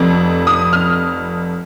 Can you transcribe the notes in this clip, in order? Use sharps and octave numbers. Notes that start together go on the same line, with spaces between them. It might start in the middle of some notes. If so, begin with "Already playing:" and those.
Already playing: F1 F2
D#6
F6